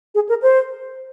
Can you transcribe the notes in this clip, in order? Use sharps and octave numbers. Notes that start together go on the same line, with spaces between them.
G#4
A#4
C5